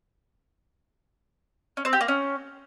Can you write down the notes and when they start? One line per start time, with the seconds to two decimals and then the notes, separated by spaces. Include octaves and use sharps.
1.77 C#4
1.85 C4
1.93 G4
2.01 A#3
2.08 C#4